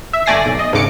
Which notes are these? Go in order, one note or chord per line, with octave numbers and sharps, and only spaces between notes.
E5
G1 A3 D5 G#5 A#6 C7
B1
D#5
G#1 D2 G#2 C#3 D6 C#7